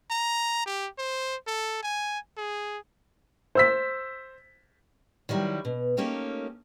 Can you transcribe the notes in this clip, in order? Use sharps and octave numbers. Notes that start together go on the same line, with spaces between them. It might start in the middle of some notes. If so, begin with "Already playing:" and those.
A#5
G4
C5
A4
G#5
G#4
C5 E6 B6
D#3 F#3 G3 E4
B2
A3 A#3 C#4 D#4 G4